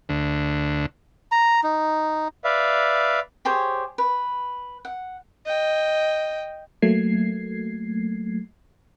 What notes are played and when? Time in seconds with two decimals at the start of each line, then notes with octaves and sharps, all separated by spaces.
0.09 D2
1.32 A#5
1.64 D#4
2.44 B4 D5 E5 F5
3.45 G4 G#4 C5 C#5
3.98 B4
4.85 F#5
5.45 D#5 G5
6.82 F#3 A3 A#3 G#6 C7